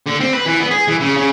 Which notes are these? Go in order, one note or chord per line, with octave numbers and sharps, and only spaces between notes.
D3
C4
B4
E3
B3
G#4
E3
C#3
C#3